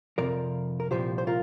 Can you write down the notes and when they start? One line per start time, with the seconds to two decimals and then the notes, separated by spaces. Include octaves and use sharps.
0.18 F2 C3 F3 A#4 D5
0.80 A#4
0.91 C2 A#2 F3 G4 C5
1.18 C5
1.27 F4 A#4